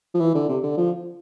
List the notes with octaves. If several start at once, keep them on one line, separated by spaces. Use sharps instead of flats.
F3
E3
D3
C3
D3
F3